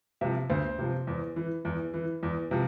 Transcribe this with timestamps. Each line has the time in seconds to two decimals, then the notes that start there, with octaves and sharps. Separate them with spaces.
0.21 C3 F3 E5
0.50 D2 C5
0.79 C3 F3
1.07 E2
1.36 E3
1.65 E2
1.94 E3
2.23 E2
2.51 C3 F3